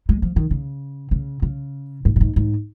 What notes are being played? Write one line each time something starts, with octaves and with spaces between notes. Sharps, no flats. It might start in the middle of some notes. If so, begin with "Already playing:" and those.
G#3
F3
D#3
C#3
C#3
C#3
G#2
A#2
G#2
G#2